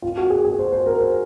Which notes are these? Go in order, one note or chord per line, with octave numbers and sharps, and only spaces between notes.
F4
F#4
G#4
G#4
C5
C5
A#4
C5